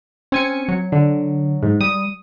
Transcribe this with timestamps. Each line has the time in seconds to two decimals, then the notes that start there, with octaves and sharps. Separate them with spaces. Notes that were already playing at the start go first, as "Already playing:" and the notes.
0.32 C4 C#4 G#5 C#7
0.69 F#3
0.92 D3
1.63 G#2
1.81 G3 D#6